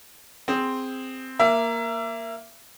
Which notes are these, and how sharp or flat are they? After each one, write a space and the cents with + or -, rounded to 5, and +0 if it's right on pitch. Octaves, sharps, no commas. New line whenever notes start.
C4 -5 G#4 -5
A#3 +0 E5 +30